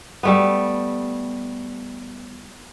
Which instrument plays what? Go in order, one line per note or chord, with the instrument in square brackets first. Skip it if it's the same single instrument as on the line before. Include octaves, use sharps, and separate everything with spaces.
[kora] G3 A3 B3